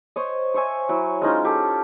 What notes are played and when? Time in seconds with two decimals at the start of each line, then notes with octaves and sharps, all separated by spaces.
0.16 C5 C#5 D#5
0.54 C5 C#5 E5 G#5
0.89 F#3 E4
1.21 G#3 C#4 D#4 F4
1.45 G4 A4